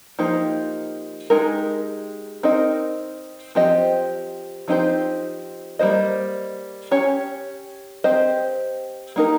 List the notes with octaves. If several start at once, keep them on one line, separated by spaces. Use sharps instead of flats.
F3 A#3 D#4 G4 C5
G#3 D#4 G4 A#4
C4 D#4 A#4 D#5
F3 C4 G4 C5 D#5
F3 C4 D#4 G4 C5
G3 A#3 F4 C5 D#5
C#4 G4 C#5
C4 G4 C5 D#5
A#3 D#4 G4 A#4